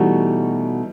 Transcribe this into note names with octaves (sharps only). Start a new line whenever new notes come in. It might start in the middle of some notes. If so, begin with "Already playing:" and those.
Already playing: B2 E3 G3 A3 D#4 F#4